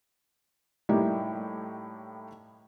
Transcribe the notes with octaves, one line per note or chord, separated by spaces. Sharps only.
A2 G3 A#3 D#4 E4 G4